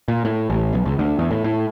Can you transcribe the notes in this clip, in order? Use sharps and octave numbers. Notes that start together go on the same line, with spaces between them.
A#2
A2
A1
B1
C#2
D2
E2
A2
A2